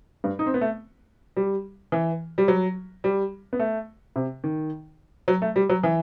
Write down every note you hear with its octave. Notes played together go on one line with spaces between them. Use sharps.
G2
D#4
C4
B3
A3
G3
E3
G3
F#3
G3
B3
A3
C3
D#3
F#3
A3
G3
F#3
E3